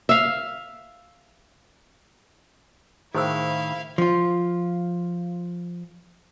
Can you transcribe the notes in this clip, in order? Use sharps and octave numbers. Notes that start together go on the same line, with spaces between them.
E5 F5
A2 D#3 E4 G#4 C5 F5 E6
F3 F4